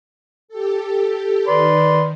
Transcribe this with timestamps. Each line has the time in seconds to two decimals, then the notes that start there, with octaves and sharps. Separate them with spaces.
0.48 G4 A4
1.47 D#3 B4 D5 C6